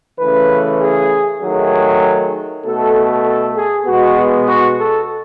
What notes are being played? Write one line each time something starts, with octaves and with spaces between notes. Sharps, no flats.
C#3 E3 A3 B4
G#4
D#3 F#3 A3 G#4
B2 A3 A4
A4
G#4
B2 G#3 B3 F#4
F#4
A4